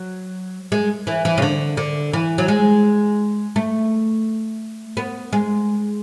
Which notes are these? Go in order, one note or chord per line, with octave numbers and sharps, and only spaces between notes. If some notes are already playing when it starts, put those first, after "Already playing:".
Already playing: F#3
G#3
E3
E3
C#3
D3
D3
E3
F#3
G#3
A3
B3
G#3